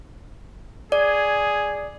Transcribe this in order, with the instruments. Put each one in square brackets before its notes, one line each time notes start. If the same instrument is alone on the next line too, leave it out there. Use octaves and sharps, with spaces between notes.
[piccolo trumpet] G#4 [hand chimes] D5